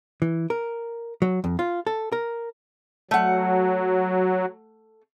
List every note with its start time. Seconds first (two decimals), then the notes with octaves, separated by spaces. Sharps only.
0.22 E3
0.50 A#4
1.22 F#3
1.44 F2
1.59 F4
1.87 A4
2.12 A#4
3.11 F#3 A3 F#5